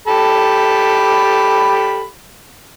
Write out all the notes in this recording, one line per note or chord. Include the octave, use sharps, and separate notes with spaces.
G4 A4 B5